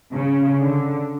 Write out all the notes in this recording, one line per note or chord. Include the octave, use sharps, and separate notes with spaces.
C#3
D3